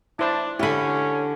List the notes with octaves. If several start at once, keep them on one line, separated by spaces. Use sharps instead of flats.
D4 E4 C5 A5
D3 C#4 E4 G4 G#5 B5